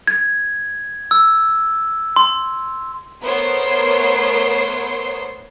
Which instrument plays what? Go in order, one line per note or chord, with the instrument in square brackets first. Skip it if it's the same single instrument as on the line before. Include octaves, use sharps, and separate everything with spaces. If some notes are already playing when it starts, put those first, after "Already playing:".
[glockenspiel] G#6
E6
C6
[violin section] A3 B3 A#4 C5 C#5 C7